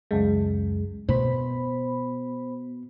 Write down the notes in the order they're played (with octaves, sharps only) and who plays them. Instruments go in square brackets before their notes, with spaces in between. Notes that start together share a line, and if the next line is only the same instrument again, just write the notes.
[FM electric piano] C#2 F#2 G#3
[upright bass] B2 [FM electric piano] C5 B5